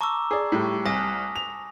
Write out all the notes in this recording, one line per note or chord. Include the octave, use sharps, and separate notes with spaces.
A5 A#5 C#6 D6 E6
G#4 D5
A2 G3
C2 G#5 D#6 A#6
F7